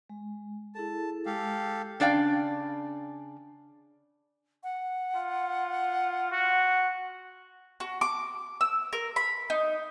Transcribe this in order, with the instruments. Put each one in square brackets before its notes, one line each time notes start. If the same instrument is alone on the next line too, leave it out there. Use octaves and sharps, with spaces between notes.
[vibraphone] G#3
[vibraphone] E4 G#4 A4 [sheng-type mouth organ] A5
[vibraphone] G#3 [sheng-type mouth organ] G4 A4 F5
[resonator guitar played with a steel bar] C#3 D4 D5 F5 G5
[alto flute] F#5
[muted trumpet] F4
F#4
[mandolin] F#4
D6
E6
A#4
B5
D#4